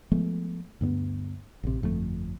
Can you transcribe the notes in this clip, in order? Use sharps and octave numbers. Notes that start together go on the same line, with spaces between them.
F3 G#3 A3 B3
D2 G2 A#3 B3
A1 C3
G1 F2 B2 A3